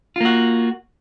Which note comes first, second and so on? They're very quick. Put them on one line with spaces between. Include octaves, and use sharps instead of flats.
F4 A#3 F#4